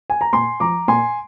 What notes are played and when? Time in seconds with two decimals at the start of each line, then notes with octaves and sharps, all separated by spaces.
0.10 G#5
0.21 A#5
0.33 A#2 G#5 C6
0.60 F3 A#5 D6
0.88 A#2 G#5 C6